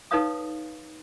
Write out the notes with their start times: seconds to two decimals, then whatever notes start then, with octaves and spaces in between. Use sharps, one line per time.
0.11 D#4 A4 B4 C#5 F5 D#6